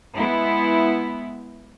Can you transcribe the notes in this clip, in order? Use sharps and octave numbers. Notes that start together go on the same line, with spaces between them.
G#3 B3 E4